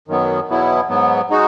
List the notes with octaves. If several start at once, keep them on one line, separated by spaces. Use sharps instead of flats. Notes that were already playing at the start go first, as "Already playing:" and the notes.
F#2 D#3 F#3 B3
E2 B2 F#3 B3 E4
G#2 F#3 B3
G#3 D#4 F#4